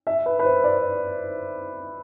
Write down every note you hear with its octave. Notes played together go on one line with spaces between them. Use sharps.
E5
B4
B4
C5
D5